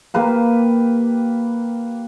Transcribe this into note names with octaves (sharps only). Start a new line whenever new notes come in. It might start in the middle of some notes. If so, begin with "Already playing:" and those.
A#3 G4 B4 F5